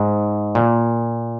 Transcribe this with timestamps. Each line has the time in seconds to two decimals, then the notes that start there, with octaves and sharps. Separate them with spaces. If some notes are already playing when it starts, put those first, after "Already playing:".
Already playing: G#2
0.55 A#2